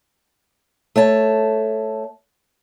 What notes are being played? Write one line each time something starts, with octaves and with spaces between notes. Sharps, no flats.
A3 C#5 A5